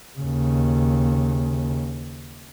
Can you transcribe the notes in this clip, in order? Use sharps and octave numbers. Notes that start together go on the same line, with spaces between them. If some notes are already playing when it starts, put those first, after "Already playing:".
D#2 C#3